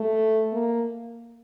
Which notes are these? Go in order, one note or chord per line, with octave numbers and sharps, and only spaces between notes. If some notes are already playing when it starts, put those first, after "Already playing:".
Already playing: A3
A#3